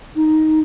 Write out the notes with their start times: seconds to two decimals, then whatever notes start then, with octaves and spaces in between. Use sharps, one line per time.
0.16 D#4